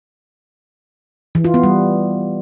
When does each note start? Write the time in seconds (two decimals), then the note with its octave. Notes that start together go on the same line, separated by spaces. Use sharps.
1.35 E3
1.45 F4
1.54 B3
1.63 G3